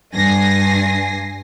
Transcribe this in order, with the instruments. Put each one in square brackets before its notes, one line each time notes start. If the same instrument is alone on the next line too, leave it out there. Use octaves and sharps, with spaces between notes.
[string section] G2 G#5 A#6 C7